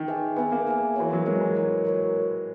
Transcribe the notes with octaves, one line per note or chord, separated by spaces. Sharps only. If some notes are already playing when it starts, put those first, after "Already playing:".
Already playing: D#3
G#4 B4 E5 G#5
B3 G#4 B4 E5 G#5
A#3
G#4 B4 E5 G#5
E3 F#4 A#4 C#5
F#3
G#3 F#4 A#4 C#5
E3
F#4 A#4 C#5
F#4 A#4 C#5